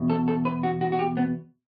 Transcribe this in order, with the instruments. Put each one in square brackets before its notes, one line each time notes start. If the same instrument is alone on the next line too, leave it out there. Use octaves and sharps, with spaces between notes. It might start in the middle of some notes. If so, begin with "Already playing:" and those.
Already playing: [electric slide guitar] E2 B2
A4
A4
B4
F#4
F#4
F#4
G4
B3